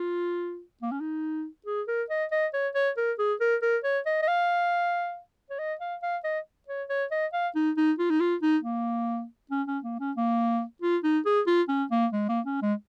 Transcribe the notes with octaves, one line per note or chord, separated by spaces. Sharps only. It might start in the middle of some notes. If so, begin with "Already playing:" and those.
Already playing: F4
A#3
C#4
D#4
G#4
A#4
D#5
D#5
C#5
C#5
A#4
G#4
A#4
A#4
C#5
D#5
D#5
F5
C#5
D#5
F5
F5
D#5
C#5
C#5
D#5
F5
D#4
D#4
F4
D#4
F4
D#4
A#3
C#4
C#4
A#3
C#4
A#3
F4
D#4
G#4
F4
C#4
A#3
G#3
A#3
C#4
G#3